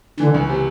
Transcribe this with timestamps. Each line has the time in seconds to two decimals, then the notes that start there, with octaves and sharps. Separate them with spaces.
0.20 D3 E3
0.34 C#2
0.49 C3